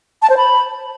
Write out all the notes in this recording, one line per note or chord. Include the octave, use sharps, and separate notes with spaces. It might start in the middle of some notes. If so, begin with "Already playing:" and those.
A5
C5
B5